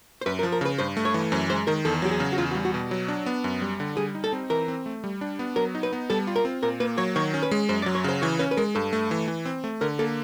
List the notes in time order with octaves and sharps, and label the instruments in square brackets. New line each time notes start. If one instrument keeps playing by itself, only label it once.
[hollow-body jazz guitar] C5
[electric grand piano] F#2 [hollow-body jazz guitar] B4
[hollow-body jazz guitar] A#4
[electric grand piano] F3
[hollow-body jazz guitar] A#4
[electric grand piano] C#3 [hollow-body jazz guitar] B4
[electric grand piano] G2 [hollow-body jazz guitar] C5
[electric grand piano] A3
[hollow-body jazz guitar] C#5
[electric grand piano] E3
[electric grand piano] F#2 [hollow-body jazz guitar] C5
[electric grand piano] G#3 [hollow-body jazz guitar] C5
[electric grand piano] D#3 [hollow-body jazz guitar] A#4
[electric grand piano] E2 [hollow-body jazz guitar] A4
[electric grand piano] F#3 [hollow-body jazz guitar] G4
[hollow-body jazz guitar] G#4
[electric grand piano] C#3
[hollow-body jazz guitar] F#4
[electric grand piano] E2 [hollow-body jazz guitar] F4
[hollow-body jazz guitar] F#4
[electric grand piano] G3
[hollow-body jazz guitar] F#4
[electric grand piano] B2
F#3
D4
B3
F#2
G3
D3
[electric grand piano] G3 [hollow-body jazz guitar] G#4
[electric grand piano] D#4
[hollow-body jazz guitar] A4
[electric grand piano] C4
[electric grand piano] E3 [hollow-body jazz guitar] A#4
[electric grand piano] C4
A3
G3
D4
B3
[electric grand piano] F#3 [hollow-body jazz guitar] A#4
[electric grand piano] D#4
[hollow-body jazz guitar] B4
[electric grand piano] B3
[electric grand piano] G3 [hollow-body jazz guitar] A4
[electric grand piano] F4
[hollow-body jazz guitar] A#4
[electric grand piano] C4
[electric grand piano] A#2 [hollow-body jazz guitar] A#4
[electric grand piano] A#3 [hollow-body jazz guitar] B4
[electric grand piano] F#3 [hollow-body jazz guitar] C#5
[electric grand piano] D#3 [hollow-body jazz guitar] C#5
[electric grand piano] C#4
[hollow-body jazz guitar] B4
[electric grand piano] G#3
[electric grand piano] F#2 [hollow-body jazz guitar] C5
[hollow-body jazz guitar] D5
[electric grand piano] F#3
[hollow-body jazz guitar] C#5
[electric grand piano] C#3 [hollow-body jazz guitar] C5
[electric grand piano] E3 [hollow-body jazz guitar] C#5
[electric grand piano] C#4 [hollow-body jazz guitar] B4
[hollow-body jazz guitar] B4
[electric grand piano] G#3 [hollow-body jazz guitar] A#4
[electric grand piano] G2 [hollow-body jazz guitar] A4
[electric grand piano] A3
E3
E3
C4
A3
[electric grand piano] D3 [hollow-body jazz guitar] A#4
[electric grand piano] A#3 [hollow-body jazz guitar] A4